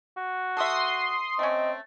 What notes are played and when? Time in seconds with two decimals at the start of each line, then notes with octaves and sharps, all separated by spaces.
0.17 F#4
0.57 A4 E5 C6 D#6 C7
1.39 A3 C4 C#4 D#5